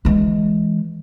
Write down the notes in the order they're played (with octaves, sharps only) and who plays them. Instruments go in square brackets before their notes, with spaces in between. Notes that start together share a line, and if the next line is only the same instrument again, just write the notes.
[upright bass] E3 G#3